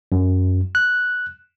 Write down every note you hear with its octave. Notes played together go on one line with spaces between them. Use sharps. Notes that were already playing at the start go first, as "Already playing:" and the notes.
F#2
F#6